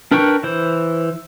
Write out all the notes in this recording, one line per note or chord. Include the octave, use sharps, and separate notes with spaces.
D4 A#4 B4 G5 C#6
E3 C5